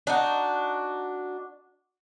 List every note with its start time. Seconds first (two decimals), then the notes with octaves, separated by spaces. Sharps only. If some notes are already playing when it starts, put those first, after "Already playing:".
0.07 D4 D#4 F#4